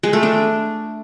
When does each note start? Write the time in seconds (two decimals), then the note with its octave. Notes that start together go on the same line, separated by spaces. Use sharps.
0.03 G#3
0.13 A3
0.23 D4